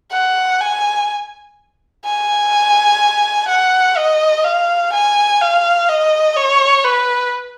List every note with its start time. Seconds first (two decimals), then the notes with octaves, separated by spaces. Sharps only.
0.12 F#5
0.61 G#5
2.05 G#5
3.49 F#5
3.97 D#5
4.45 F5
4.93 G#5
5.42 F5
5.89 D#5
6.37 C#5
6.85 B4